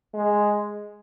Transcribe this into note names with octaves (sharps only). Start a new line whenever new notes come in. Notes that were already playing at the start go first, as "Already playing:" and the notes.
G#3